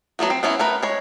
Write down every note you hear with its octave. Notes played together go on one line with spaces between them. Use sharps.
F#3 A3 B3 F#4
C4
F#3 B3 C#4 E4
A3 A#4 B4
G#3 C#5